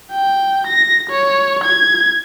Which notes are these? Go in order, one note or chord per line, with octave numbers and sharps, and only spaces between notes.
G5
A#6
C#5
G#6